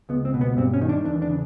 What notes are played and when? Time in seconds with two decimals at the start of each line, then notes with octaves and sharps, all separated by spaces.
0.09 C#2 B3
0.25 C4
0.34 B2
0.41 B3
0.57 G2 C4
0.74 C#4
0.81 D#3
0.89 D4
1.05 E2 D4
1.22 D4
1.29 C#3